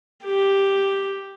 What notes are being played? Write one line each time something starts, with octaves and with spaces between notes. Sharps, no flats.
G4